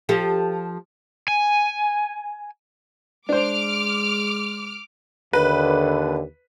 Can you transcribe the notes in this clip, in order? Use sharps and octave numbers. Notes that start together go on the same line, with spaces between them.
F3 G4 A4
G#5
G#3 D4 C5 D6 F6
D#2 D3 B4